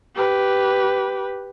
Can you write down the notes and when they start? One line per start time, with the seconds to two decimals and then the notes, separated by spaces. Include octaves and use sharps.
0.16 G4 B4